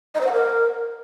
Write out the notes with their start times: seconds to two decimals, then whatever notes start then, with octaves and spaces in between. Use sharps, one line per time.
0.15 D#5
0.20 C5
0.26 F#5
0.32 A#4